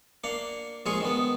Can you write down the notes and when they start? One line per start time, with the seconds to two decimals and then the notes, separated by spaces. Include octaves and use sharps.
0.24 A#3 D4 F5 F#5
0.86 A#1 G#3 F4 G#4 F5 C#6
1.01 D#3 G#3 B3